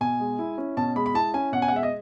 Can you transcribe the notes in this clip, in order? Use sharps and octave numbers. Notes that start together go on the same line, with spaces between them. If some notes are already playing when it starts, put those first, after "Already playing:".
B2 G#5
G#3
E4
C#4
B2 A5
G#3 B5
B5
E4 A5
C#4 G#5
B2 F#5
G#5
F#5
G#3 E5
D#5